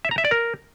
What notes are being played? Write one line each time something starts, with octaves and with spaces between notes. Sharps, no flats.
E5
A#5
E5
D5
A#4